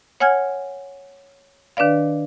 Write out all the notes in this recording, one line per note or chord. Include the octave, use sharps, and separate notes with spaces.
C#5 F#5 G#5 F6 G#6
D#3 D4 B4 D5 F5